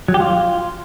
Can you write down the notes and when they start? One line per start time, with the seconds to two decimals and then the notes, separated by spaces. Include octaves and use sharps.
0.08 F#3
0.14 G4
0.20 F4